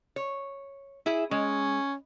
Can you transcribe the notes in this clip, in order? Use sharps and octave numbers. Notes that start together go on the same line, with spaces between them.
C#5
E4 G#4 E5
G#3 C#4